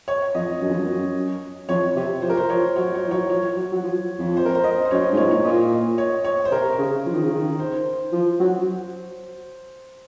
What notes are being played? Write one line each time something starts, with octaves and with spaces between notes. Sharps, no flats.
C#5
F2 D#5
F#2
F2
F#2
F2 C#5
C3
F3 C5
A#4
C5
F3 C#5
F#3 C#5
C#5
F3
F#3 C#5
F3 C#5
F#3
F#3
F3
F2
C5
A#4
C5
D#5
C5
F#2 C#5
D#5
G#2
A#2 C#5
C#5
A#2 D#5
C#5
C#5
C5
C3 A#4
C#3
F3
D#3
C#3
D#3
C5
F3
F#3